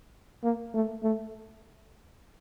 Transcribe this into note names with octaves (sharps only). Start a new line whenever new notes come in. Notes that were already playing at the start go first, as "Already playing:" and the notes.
A#3
A3
A3